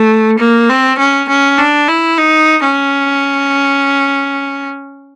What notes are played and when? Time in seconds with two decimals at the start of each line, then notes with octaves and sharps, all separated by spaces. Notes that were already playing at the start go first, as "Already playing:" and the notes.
Already playing: A3
0.39 A#3
0.69 C4
0.99 C#4
1.29 C#4
1.58 D4
1.88 E4
2.18 D#4
2.63 C#4